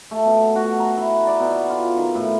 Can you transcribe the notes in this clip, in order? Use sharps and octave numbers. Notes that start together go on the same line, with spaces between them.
A3
B2
F#4
A#5
E4
D5
B2
F4
D#3
A2